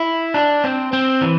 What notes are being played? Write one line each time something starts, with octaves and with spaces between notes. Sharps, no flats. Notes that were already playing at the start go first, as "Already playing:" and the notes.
Already playing: E4
D4
C4
C4
E3